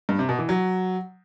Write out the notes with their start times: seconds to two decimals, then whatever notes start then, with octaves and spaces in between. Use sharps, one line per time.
0.09 G2
0.19 C3
0.29 B2
0.39 E3
0.49 F#3